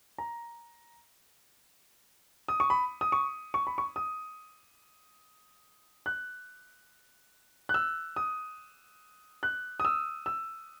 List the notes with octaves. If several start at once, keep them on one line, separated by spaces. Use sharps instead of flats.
A#5
D#6
C#6
B5
D#6
C#6
C#6
B5
C#6
D#6
F#6
F#6
E6
D#6
F#6
D#6
E6
E6